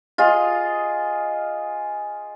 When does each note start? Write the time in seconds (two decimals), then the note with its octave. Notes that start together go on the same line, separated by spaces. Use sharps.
0.18 F4 G#4 D#5